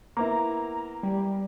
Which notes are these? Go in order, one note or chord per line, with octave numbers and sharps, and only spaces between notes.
A#3 B3 E4 A#5
G3